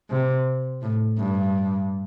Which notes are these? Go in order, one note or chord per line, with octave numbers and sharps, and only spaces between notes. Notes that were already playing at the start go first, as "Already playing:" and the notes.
C3
A2
G2